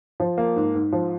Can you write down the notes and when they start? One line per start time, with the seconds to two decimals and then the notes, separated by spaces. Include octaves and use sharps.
0.20 F3
0.38 A#3
0.56 G#2
0.75 G#2
0.92 F3